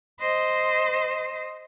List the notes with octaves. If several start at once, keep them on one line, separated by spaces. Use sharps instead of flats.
C5 D#5